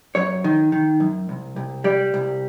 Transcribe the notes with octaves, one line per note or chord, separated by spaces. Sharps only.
F#2 C#5
D#3
D#3
F#2
C2
C2
G3 D5
C2